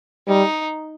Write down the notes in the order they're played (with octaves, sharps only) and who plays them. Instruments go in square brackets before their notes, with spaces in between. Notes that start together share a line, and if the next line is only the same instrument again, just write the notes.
[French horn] G3 [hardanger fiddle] D#4